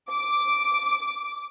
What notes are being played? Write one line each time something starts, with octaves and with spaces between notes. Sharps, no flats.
D6